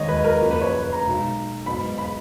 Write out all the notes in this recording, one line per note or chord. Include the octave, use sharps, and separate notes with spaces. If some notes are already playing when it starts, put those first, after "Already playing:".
Already playing: D#2 D#3 G#3 C#5 D#5
B4
A#4
F#2 F3 A#3
B4
C#5
B4
B4
A#5
B1 B2 G#3
G#2 F#3 B3 D#4 B5
B5